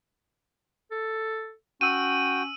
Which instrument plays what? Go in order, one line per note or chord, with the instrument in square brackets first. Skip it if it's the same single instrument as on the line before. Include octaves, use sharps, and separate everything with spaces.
[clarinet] A4
[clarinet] C#4 [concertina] F#4 G5 [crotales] E6 D#7